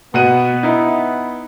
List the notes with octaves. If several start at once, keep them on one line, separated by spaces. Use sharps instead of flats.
B2 B3 F#5 D#7
D#4 E4